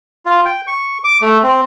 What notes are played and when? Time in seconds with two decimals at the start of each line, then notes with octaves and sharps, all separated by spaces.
0.26 F4
0.45 G5
0.67 C#6
1.04 D6
1.22 A3
1.43 C4